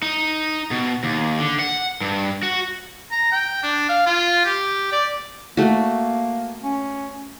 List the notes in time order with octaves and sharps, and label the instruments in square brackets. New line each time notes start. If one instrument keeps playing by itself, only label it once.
[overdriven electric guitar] D#4
B2
D#2
D3
F#5
G2
F#4
[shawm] A#5
G5
D4
F5
F4
G4
D5
[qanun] A3 F#4 [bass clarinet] A#3
[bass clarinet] C#4